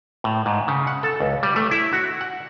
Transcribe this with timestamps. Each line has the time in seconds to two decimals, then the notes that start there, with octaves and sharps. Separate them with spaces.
0.24 A2
0.46 G#2
0.68 C#3
0.87 F#5
1.03 A4
1.20 C#2
1.43 G3
1.56 A3
1.71 E4
1.93 F#4
2.21 F#5